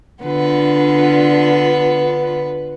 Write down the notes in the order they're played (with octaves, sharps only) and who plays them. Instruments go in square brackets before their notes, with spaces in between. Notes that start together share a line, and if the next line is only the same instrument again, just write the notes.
[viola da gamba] D3 D4 F4 [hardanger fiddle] B3 B4